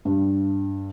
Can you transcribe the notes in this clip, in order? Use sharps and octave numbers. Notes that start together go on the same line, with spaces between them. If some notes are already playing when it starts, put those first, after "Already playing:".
G2